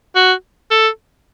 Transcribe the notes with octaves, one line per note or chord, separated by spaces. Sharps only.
F#4
A4